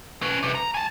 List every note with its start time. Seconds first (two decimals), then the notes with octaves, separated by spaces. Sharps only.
0.22 C#4 B4
0.43 C3 B4
0.55 A#5
0.74 G#5 A5